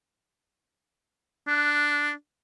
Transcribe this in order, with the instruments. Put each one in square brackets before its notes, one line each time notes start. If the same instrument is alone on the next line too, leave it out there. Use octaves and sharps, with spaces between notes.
[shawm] D4 [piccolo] F#6